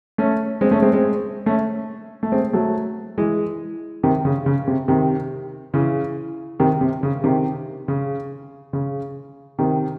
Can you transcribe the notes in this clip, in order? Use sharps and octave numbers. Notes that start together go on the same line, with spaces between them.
A3 C#4
G#3 C4
A3 C#4
G#3 C4
G#3 C4
A3 C#4
A3
G#3 C4
F#3 A3
E3 G#3
C3 D#3
C#3
C#3
C3
C3 D#3
C#3 E3
C3 D#3
C3
C#3
C3 D#3
C#3
C#3
C3 D#3